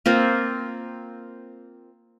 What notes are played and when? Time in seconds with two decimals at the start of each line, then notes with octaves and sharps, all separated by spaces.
0.06 A#3 C4 F4